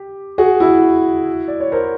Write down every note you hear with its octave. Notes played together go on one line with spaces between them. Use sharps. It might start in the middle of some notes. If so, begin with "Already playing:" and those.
Already playing: G4
F#4 G#4
E4 F#4
D5
C#5
A#4 C5